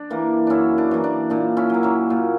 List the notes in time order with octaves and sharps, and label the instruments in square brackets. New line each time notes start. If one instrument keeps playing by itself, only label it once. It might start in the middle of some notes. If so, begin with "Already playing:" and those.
Already playing: [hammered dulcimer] D4
E3 A#3
F#2 C#4 D4 E4
D4
E3 A#3
D4
A#2 D4
C#4 E4
F#3 A#3
C#4 E4
A#2